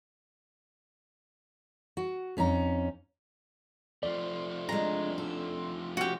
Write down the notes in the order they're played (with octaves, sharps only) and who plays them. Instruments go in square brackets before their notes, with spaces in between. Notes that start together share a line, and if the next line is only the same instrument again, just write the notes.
[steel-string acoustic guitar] F#4
F2 C#4 D#4 A#5
[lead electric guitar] F3 A3 [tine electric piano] D5
[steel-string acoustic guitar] G#3 D4 [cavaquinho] A#5
[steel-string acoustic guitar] A4
[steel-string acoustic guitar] C#4 [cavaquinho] F#4 G4